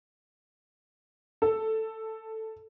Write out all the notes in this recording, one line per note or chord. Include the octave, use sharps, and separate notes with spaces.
A4